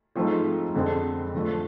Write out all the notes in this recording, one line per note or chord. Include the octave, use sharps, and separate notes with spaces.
G#2 F3 A3 C4 F4
F2 D3 G#3 C4
D3 F3 A3